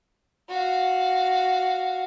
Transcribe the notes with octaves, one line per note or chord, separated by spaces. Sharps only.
F#4 F5